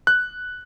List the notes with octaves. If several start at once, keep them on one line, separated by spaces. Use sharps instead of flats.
F#6